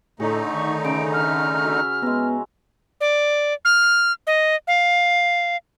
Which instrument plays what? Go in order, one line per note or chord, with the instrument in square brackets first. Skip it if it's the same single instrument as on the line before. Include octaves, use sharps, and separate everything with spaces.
[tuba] A2 [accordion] D3 A3 D#4 [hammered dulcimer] G#4 C#5 A#5
[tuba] D#3 [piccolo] C#6
[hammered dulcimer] C#3 A#5 [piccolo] D7
[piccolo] F6
[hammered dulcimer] F#4 B4 E5
[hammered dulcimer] G#3 G#5 A#5 [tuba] B3
[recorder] D5
F6
D#5
F5